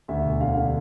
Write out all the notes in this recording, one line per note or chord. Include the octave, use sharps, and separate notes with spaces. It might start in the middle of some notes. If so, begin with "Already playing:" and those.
D2 E5
E1
D3 F5
D3